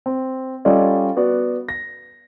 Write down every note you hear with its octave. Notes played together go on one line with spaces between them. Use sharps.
C4
G3 C#4 F4 A4 D5 D#5
B3 F#4 D5
A#6